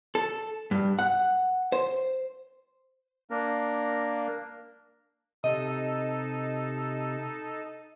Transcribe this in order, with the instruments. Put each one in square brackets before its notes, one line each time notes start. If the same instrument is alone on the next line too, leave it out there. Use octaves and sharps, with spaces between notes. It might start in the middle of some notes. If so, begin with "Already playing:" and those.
[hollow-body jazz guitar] A4
G2
F#5
C5
[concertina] A#3 D4 A#4
[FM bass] C3 [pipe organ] D#4 A4 [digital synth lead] D#5